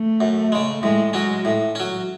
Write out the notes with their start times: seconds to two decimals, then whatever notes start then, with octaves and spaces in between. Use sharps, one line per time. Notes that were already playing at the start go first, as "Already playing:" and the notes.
Already playing: A3
0.21 F#2
0.52 C#3 G#3
0.83 A2 G#3
1.13 F#3 G#3 C#4
1.45 A2
1.75 F#3 C#4